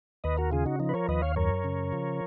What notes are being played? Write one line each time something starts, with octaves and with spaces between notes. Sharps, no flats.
D#2 B4 D#5
F#4 A#4
C#3 F4 G#4
D#4 F#4
F3 D#4
B4
A#4 C#5
D#2 B4 D#5
C#5 F5
F#2 A#4 C#5
C#3
F3